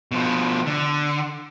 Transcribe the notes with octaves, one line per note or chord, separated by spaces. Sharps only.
B2 F3
D3